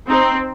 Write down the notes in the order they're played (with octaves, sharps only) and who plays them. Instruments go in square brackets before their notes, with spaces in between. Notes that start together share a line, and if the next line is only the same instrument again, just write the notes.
[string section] C4 [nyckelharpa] D#4